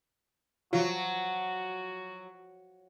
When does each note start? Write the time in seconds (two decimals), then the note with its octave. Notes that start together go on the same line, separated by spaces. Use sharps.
0.73 F3 F#3 F4 F#4 A5